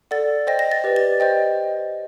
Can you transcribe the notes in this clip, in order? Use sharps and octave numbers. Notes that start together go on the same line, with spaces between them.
A4 D5 F#5 A6
C5 D#5 G5 A#6
A#6
A6
G4 B4 D5
A6
C5 D#5 G5